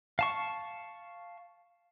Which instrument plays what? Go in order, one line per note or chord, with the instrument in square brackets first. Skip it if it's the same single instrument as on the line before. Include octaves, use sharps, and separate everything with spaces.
[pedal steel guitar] F5 A5 C#6